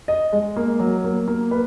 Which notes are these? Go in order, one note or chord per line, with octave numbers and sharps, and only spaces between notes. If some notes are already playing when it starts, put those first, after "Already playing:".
D#5
G#3
A#3
F#3
A#3
A#3
B4